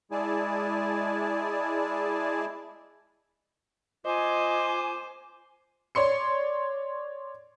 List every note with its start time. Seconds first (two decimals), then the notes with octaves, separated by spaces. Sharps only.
0.12 G#3 E4 G#4 D5 G#5 A5
4.05 F4 C5 D#5 G#5 D6
5.95 C#5 D5 C6 C#7